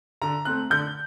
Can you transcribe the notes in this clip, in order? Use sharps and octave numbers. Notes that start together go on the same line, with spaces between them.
D3 A#5
A3 C4 F#6
D3 G6